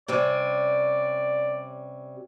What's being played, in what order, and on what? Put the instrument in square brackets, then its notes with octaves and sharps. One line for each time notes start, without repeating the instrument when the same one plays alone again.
[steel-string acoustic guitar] C3 G3 C#4 [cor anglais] D5